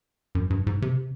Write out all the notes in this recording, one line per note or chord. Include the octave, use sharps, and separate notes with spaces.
F#2
G2
G#2
C3